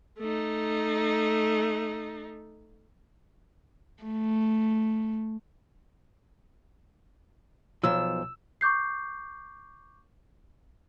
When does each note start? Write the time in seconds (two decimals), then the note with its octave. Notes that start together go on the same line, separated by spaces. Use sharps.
0.20 A3 D#4
4.04 A3
7.83 B1 F3 E6
8.61 C#6 D6 G6 C7